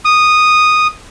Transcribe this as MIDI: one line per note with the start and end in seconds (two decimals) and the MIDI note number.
0.05 0.87 87